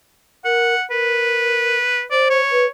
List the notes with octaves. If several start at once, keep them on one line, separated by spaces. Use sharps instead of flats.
A#4 F#5
A#4 B4
C5 D5
C#5
B4